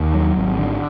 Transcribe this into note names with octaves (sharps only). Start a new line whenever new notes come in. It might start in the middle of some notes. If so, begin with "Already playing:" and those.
Already playing: D#2
F#3
G#1
D3